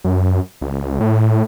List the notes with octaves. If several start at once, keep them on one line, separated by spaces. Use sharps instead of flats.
F#2
C#2
A2